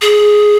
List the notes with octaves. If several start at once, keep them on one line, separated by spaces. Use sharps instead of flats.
G#4